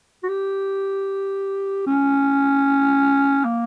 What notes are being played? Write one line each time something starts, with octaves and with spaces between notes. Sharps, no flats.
F#4
G4
C#4
A#3